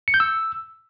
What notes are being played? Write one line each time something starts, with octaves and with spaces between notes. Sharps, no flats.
C#7
G6
E6